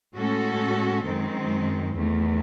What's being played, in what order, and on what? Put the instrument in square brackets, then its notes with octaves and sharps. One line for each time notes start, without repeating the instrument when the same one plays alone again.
[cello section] A2 G#3 C#4 F#4 A4
F#2 D#3 G#3 C4
E2 D#3 A3